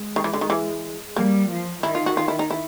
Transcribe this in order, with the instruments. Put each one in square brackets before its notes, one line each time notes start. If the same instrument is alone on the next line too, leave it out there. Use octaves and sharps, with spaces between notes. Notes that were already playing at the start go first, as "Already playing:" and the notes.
Already playing: [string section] G#3
[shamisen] D#3
E3
D3
D#3
E3
[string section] G3 [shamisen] A#3
[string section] F3
[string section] D#3 [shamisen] E4
[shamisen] F4
F#4
F4
E4
D#4
E4